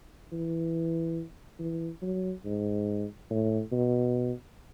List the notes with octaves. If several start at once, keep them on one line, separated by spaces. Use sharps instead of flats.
E3
E3
F#3
G#2
A2
B2